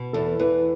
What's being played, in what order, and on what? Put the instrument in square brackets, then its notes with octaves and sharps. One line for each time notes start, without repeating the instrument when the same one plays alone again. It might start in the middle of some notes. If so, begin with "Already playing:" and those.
Already playing: [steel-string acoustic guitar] B2
[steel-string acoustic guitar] E2 [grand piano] A4
[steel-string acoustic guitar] E2 [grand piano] B4